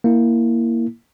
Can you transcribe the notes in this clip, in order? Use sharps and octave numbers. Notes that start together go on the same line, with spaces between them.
A#3 E4